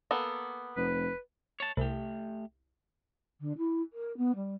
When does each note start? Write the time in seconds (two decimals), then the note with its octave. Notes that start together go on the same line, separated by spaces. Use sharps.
0.11 A#3 B3 A4
0.77 F1 B4
1.60 C#5 A5
1.77 C2 A3 G4
3.40 D3
3.58 E4
3.93 A#4
4.17 B3
4.35 G3